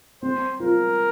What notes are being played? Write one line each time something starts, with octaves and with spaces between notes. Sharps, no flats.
C4 C5
F4 A#4